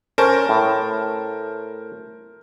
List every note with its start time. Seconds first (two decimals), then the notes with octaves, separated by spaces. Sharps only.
0.18 C#4 A#4 C5 A5
0.49 A2